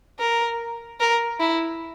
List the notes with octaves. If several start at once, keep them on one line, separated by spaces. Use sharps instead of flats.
A#4
A#4
E4